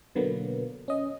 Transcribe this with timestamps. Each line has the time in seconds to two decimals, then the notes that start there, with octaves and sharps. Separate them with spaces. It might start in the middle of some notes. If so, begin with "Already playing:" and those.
0.16 B2 D3 F#3 A#3 B3
0.88 C#4 D#5